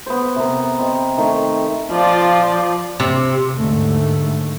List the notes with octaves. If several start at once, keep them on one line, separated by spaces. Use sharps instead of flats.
B3 C5
C3 B3 A#4
C4 D#5
D#3 A3
F3 F4 D5
C3
D#2 G#2 D3 A3